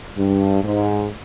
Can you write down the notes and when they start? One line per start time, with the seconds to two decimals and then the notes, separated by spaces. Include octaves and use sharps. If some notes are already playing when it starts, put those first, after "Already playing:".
0.16 G2
0.64 G#2